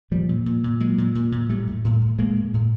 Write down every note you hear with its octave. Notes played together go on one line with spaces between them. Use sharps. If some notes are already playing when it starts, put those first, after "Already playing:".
A#2 F3 G3
A#2
A#2
A#2
A#2 F#3 G#3
A#2
A#2
A#2
A2 G3 A3
A2
A2
A2
A2 G#3 A#3
A2
A2